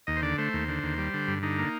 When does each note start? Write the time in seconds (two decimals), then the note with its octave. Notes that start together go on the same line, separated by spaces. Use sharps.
0.07 D#2 D#5
0.17 C5
0.22 D3 D5
0.38 A3 C5
0.53 D#2
0.68 D3
0.83 D#2
0.98 G3
1.14 D3
1.28 G2
1.43 D3 D#4
1.59 A#3